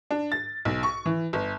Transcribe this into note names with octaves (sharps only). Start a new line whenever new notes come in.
D4
A6
B1
C#6
E3
G1